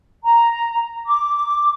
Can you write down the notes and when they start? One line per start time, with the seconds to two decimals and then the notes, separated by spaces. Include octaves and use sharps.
0.23 A#5
1.04 D6